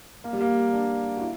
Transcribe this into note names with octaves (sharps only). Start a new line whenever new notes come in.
A#3
G3
A#3
D4
F#4
E4